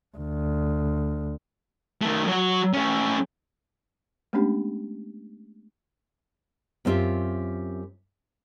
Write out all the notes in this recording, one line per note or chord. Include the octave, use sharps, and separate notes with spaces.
D2
D#3 A3
F#3 C#5
A3 C#4
G#3 A3 B3 C#4 D4 G4
F#2 B3 C4 F4 G4 E5